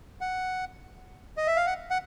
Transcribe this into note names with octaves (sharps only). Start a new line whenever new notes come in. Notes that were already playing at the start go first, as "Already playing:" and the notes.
F#5
D#5
E5
F5
F#5
F#5